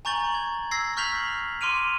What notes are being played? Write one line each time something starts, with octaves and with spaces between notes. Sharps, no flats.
G#5 A#5 C#6 G6 A6 F#7
G#6
E6 G#6 A#6 C7
C#6 F6 G6 B6 F7 F#7
C6 D6 F6 D7 D#7 F7